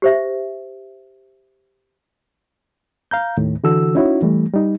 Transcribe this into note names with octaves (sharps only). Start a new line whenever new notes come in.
G4 C5 E5
F5 A#5 G6
D#2 A2 D#3
D3 E3 F#4 A4 E6
C#4 D#4 E4 F#4 C#5
E3 G3 A3
G3 D#4